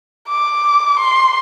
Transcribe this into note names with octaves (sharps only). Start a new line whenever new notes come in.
D6
C6